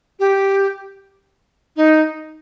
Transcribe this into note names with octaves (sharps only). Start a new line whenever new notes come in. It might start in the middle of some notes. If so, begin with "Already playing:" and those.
G4
D#4